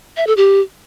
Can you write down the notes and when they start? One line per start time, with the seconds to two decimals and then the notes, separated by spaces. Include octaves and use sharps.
0.17 E5
0.27 A4
0.37 G4